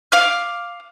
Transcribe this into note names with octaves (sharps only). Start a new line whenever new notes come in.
F5 D6 F6